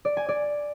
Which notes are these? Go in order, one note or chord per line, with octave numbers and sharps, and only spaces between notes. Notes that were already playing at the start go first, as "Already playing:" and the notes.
D5
G#5
D5